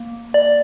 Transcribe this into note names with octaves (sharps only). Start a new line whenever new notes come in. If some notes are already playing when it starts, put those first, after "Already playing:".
Already playing: A#3
D5